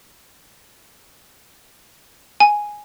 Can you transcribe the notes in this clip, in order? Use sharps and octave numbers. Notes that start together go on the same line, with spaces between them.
G#5